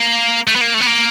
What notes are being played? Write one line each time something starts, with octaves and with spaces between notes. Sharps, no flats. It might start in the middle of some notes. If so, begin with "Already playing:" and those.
Already playing: A#3
A3
B3
A#3
A3
B3
A#3